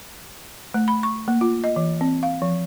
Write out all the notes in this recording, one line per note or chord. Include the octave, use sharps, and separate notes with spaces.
A3
B5
C#6
A#3
F4
D#5
E3
C4
F5
F3